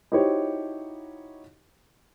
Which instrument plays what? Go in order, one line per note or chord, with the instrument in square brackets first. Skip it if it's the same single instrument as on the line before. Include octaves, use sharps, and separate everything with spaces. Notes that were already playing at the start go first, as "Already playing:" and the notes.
[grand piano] D#4 E4 F#4 G4 C5 C#5